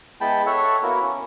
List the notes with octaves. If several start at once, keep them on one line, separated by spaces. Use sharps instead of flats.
G#3 B3 E4 G5 A5 B5
A4 C#5 E5 F#5
A#3 B3 E4 F#4 A#4
C#4